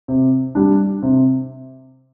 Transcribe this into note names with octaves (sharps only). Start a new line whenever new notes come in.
C3
G3 D4
C3